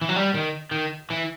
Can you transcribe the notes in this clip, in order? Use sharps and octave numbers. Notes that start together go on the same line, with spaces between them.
E3
F#3
G3
D#3
D#3
E3